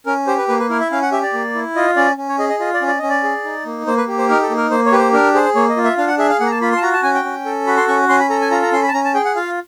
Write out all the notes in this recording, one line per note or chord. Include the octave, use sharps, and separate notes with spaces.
C#4 A#4
G4 C5
B4
A#3 B4
B4
E4 A#4
E5
C#4 F5
F#5
G4 E5
D5
A#3
E4
F4 D#5
C#4 D5
C#4
C#5
G#4 D#5
D#5
F4 D#5
D5
C#4
D5
C#4 D#5
D5
G#4
D#4
A#3
A#3 C5
B4
G4
C5
D#4 A#4
A4
A#3
A#4
A#3 C5
C#5
G4 B4
C5
D4 A#4
G#4 C5
A#3 C#5
D#5
F4
E5
D4 F5
F#5
G#4 E5
F5
A#3 F#5
A#5
A5
F4 B5
C6
A5
F#4 A#5
A5
C#4 G#5
G5
C#4
A4
F#4 B5
C6
C#4 C#6
C#4 C6
B5
A4 A#5
G#5
F4 A#5
A#5
C#4 C6
B5
A5
C#4 A#5
A5
G#4 G5
F#5
F4 F5